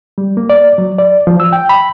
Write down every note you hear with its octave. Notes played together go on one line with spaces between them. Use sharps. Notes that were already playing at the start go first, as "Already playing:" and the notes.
G3
A#3
D5
F#3
D5
F3
E6
G5
B5